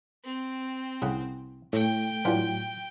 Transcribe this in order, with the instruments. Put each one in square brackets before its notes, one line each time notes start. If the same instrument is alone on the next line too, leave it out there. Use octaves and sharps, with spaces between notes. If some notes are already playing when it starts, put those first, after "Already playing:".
[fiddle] C4
[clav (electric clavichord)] C2 G#4 F#5 [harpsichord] C#3
[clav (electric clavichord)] A2 [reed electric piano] A3 [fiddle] G5
[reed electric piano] A2 F#3 [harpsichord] E3 G3 [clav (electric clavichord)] D4 F4 F#5